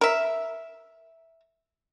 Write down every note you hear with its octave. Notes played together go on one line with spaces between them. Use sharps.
A#4 E5